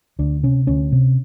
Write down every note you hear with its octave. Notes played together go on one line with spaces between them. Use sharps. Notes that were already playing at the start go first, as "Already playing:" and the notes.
D2 D4
C3 C#4
D2 C#4
C3